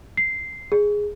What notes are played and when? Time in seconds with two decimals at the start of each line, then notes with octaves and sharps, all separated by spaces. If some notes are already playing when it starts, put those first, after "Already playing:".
0.17 C7
0.72 G#4